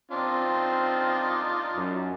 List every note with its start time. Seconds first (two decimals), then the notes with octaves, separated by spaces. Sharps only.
0.11 C4 D4 D#4 F4
1.76 F#2